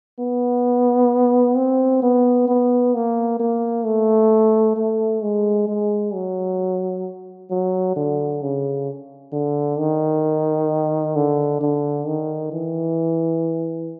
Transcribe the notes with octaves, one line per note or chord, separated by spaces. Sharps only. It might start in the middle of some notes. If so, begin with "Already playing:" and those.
B3
C4
B3
B3
A#3
A#3
A3
A3
G#3
G#3
F#3
F#3
D3
C#3
D3
D#3
D3
D3
D#3
E3